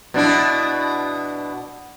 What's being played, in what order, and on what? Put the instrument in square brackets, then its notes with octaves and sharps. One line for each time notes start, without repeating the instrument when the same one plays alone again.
[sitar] B2 D4 E4